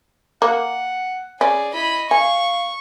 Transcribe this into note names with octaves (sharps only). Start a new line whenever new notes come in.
A#3 F#5
C#4 G#4 D5
E4 D#5 B5
F5 G#5 C#6